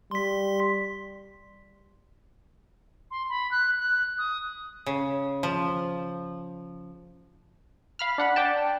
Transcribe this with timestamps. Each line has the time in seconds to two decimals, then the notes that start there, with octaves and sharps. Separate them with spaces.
0.11 G3 C6 B6
3.11 C6
3.29 B5
3.51 F#6
3.79 F#6
4.18 D#6
4.86 C#3
5.43 F3
7.99 F5 B5 F6
8.18 D4 F#5 B5
8.36 D5 G5 A5